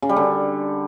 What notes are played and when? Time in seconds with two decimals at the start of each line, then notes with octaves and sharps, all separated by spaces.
0.02 C#3
0.09 G3
0.16 D3